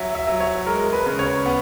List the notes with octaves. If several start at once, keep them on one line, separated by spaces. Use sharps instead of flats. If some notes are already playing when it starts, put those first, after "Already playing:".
Already playing: F#3 E5
E5
F#3
C#5
G#3 A#4
B4
C#3
C#5
B3